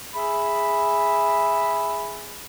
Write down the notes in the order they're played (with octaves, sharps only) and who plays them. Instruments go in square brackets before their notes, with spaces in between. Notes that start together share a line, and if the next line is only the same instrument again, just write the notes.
[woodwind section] G#4 E5 B5